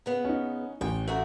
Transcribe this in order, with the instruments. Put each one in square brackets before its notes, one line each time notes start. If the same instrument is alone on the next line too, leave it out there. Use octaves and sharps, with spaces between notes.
[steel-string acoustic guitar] C#3 B3
[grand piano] C#4 D#4
[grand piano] A1 [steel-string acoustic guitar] C#5 G5
[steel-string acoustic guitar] A3 F#4 A#4